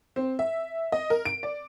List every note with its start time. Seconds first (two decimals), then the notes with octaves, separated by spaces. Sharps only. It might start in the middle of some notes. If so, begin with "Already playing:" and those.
0.16 C4
0.39 E5
0.92 D#5
1.10 A#4
1.25 D7
1.43 D5